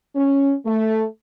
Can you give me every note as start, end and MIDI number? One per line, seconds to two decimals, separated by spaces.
0.16 0.54 61
0.66 1.04 57